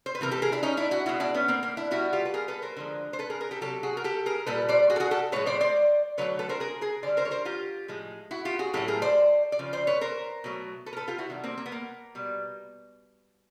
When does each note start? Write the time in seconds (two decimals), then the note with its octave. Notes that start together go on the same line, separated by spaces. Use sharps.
0.06 C5
0.15 B4
0.21 C3 E3 A3 A#4
0.31 G4 A4
0.42 G#4 A#4
0.52 D4 E4
0.63 C#4 D#4
0.77 D4 E4
0.91 E4 F#4
1.06 B2 G#3 E4 F#4
1.20 D4 E4
1.34 B3 C#4
1.48 A#3 C4
1.63 A#3
1.77 D4 E4
1.91 B2 G3 E4 F#4
2.13 F4 G4
2.25 B4
2.34 G#4 A#4
2.48 A4 B4
2.62 A#4 C5
2.77 D3 F3 G#3
3.13 C5
3.19 A4 B4
3.30 G#4 A#4
3.40 G#4 A#4
3.51 G4 A4
3.61 C3 D#3 F#3 G4 A4
3.83 F#4 G#4
3.97 A#4
4.04 G4 A4
4.26 G#4 A#4
4.46 A#2 G3 A4 B4
4.69 C5 D5
4.90 F#4 G#4
4.96 A4
5.00 F#4 G#4
5.11 G4 A4
5.32 A2 F3 G#3 B4 C#5
5.46 C5 D5
5.61 C5 D5
6.18 D3 F#3 A3 B4 C#5
6.39 A4 B4
6.49 A#4 C5
6.60 G#4 A#4
6.81 G#4 A#4
7.03 D3 G3 C5 D5
7.17 A#4 C5
7.25 C#5
7.31 A#4 C5
7.45 F4 G4
7.88 A2 F3 G#3
8.31 E4 F#4
8.45 F4 G4
8.59 F#4 G#4
8.74 A2 F#3 A3 G4 A4
8.88 G#4 A#4
9.02 C5 D5
9.52 D5
9.59 C#3 F3
9.73 C5 D5
9.87 B4 C#5
10.01 A#4 C5
10.44 B2 F#3 A3
10.86 A4 B4
10.93 A#4
10.97 A4 B4
11.08 F4 G4
11.18 E4 F#4
11.29 C3 D#3 G3
11.44 A#3 C4
11.58 A#3
11.66 B3
11.72 A#3
12.15 B2 G3